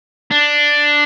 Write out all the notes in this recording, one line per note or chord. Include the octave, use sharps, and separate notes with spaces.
D4